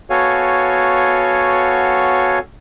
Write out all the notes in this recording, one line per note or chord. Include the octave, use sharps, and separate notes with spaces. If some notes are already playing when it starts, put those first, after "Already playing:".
B3 F#4 A4 C#5 F5 G#5